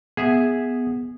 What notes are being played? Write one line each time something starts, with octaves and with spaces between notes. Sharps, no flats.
B3 G#4 E5